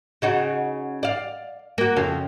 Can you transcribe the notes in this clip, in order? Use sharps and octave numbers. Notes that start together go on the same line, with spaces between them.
C#3 D#4 F#4
D5 F5
A#3 F#4
F2 C#3 F5